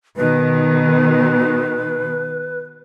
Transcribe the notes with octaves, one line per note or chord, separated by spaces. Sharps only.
B2 D#3 B4